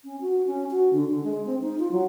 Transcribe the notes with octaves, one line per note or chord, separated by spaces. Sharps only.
C#4
F#4
C#4
F#4
D3
D3
G#3
C4
D#4
F4
F#3